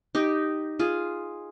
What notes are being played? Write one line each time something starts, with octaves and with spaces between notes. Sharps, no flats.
D#4 G4
F4 G#4